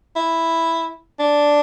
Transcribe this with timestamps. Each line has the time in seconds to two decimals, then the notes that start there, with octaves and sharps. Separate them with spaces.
0.16 E4
1.19 D4